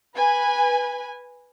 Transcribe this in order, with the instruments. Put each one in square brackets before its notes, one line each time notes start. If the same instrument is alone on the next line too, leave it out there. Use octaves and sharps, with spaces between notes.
[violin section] B4 G#5